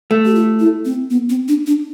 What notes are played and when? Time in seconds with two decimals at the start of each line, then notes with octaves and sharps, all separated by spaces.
0.11 A3
0.26 G4
0.35 F4
0.60 E4
0.85 C4
1.10 B3
1.29 C4
1.48 D4
1.67 D4